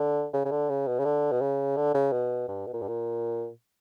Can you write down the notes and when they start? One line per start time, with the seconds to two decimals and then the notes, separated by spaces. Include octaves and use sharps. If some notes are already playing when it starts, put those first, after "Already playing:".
Already playing: D3
0.33 C#3
0.45 C#3
0.51 D3
0.69 C#3
0.88 B2
0.99 C#3
1.05 D3
1.32 B2
1.41 C#3
1.77 D3
1.94 C#3
2.12 B2
2.48 G2
2.67 B2
2.74 A#2
2.82 G2
2.88 A#2